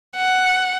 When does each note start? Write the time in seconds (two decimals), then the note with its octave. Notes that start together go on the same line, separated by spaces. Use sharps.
0.17 F#5